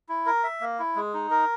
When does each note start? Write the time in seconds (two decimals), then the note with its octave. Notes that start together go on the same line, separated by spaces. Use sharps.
0.09 E4
0.26 A#4
0.44 E5
0.61 A#3
0.79 E4
0.96 G#3
1.14 D#4
1.31 A#4